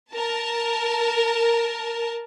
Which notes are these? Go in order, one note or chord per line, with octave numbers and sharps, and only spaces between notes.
A#4 A5